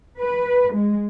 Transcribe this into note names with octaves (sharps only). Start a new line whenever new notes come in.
B4
G#3